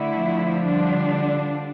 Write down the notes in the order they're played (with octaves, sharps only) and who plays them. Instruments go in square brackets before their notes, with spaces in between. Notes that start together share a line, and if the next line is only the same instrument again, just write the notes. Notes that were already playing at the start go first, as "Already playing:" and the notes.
Already playing: [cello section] D3 A3 E4
[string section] F3
[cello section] D3 G3 D4